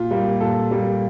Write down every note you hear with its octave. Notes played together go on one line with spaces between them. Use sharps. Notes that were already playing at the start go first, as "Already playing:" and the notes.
Already playing: A#2 F4
G3 A#3
A#2 A4
G3 A#3